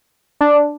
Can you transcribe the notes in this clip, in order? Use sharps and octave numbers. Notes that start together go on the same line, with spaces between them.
D4